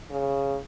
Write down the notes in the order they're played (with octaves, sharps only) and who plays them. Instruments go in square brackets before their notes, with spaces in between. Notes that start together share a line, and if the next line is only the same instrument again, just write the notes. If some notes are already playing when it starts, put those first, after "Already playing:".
[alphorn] C#3